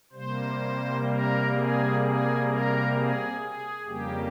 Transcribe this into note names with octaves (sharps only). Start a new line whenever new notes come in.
C3 G3 A#3 C5
A#4
G#4
G#4
A#4
G#4
G#4
F2 C#3 G3 A#3 G4